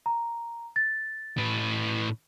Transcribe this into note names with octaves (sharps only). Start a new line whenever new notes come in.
A#5
A6
A2 B4